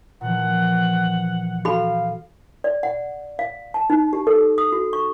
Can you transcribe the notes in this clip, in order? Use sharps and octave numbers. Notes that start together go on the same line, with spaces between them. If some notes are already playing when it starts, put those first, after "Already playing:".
A#2 E3 F3 F#5
F#4 A4 F5 B5
D5
F#5
F5
A5
D#4
G4
A4
D#6
F#4
C#6